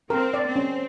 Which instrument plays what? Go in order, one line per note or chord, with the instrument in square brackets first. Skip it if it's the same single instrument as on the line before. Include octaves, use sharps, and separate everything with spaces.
[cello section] C4 [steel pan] A#4
[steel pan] D5
[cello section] C4
[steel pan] C#4